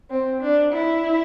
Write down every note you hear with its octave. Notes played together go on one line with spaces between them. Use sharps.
C4
D4
E4